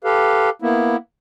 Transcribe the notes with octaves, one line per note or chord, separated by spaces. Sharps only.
G4 A4 B4 F5
A#3 B3 E4